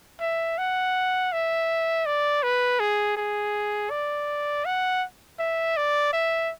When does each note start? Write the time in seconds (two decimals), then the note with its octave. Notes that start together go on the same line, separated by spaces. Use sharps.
0.21 E5
0.58 F#5
1.32 E5
2.06 D5
2.43 B4
2.80 G#4
3.17 G#4
3.90 D5
4.65 F#5
5.39 E5
5.77 D5
6.13 E5